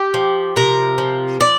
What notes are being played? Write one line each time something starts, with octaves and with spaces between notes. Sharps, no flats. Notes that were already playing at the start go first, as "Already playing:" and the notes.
Already playing: G4
F3
C3 A#4
F3
F3 D5